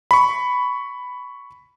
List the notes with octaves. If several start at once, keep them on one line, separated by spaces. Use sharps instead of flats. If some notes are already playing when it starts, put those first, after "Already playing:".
B5 C#6